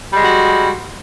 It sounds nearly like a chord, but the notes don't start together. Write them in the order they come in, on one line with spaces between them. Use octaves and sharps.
G3 G#3 F#4